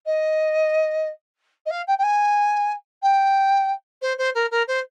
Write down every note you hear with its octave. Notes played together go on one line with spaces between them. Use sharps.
D#5
D#5
F5
G5
G5
G#5
G5
C5
C5
A#4
A#4
C5